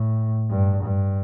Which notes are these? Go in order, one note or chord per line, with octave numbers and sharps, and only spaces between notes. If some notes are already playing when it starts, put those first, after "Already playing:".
Already playing: A2
G2
G2